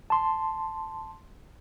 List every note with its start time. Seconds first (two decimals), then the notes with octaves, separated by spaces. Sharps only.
0.10 A5 C6